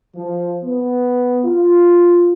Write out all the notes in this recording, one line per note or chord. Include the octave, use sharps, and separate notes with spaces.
F3
B3
F4